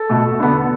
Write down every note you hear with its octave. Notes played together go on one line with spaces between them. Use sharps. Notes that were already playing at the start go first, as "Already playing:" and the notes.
Already playing: A4
B2 A3
D3 B3